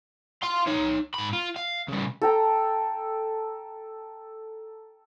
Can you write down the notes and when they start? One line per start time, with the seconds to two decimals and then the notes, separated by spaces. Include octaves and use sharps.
0.43 F5 C6
0.66 D#4 C#5
1.14 G#2 B5
1.33 F4
1.56 F5
1.88 C#3 G3
2.22 A4 G5 A#5